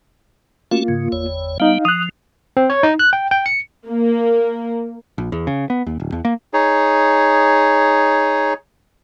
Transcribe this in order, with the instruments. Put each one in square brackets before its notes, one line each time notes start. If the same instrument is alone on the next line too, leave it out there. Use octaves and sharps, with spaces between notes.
[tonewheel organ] A3 C#4 F#4 [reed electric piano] A#3 F4
[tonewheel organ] G#2 C#3
G1 E2 C#5
[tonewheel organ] G3 B3 [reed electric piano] D#4 F5
[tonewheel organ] F3 [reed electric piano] D#6 F#6
[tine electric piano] C4
C#5
D#4
F#6
G5
G5
C#7
[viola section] A#3
[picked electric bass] A#1
E2
C#3
B3
D#2
D1
E2
A#3
[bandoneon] D#4 G#4 C#5